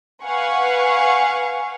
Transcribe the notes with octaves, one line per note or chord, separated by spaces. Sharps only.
B4 F5 F#5 G#5 C#6